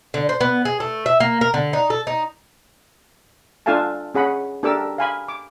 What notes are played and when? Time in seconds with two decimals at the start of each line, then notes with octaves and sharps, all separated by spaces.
0.14 D3
0.29 C5
0.41 B3
0.65 G#4
0.80 A3
1.06 E5
1.20 A#3
1.41 A#4
1.54 D3
1.73 D#4
1.90 A4
2.07 D#4
3.66 D4 F4 A4 F5 G#5 A5
4.15 C#4 G#4 F#5 B5
4.63 D4 G4 A4 A#4 D6 E6
4.98 F5 G#5 B5
5.28 D6